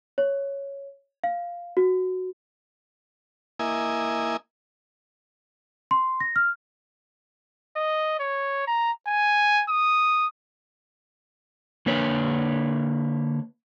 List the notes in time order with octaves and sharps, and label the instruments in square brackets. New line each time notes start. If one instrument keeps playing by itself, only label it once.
[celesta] C#5
F5
F#4
[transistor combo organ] A#3 E4 D#5 G#5
[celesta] C6
A#6
F6
[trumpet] D#5
C#5
A#5
G#5
D#6
[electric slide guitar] D3 A#3 B4 C#5